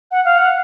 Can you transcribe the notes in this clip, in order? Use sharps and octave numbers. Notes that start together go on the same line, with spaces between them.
F#5
F5
F#5